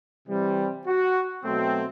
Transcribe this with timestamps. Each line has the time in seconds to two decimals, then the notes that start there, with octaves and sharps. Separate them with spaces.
0.27 C3 E3 G3 C4
0.86 F#4
1.43 B2 F#3 A3 C4